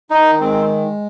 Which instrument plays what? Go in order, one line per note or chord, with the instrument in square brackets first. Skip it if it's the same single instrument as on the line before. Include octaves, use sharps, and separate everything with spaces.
[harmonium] D#3 [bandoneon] D#4
[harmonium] G#3 [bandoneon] C4